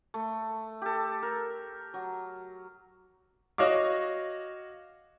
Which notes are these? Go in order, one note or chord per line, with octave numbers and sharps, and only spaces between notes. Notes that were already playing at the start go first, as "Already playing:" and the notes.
A3
G4 A4
A#4
F#3
F#4 C#5 D#5 F5 D6